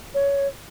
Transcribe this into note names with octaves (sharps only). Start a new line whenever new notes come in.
C#5